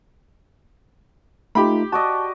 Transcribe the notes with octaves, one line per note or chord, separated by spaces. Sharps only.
A3 D#4 F4 G4 B5
F#4 D5 D#5 A5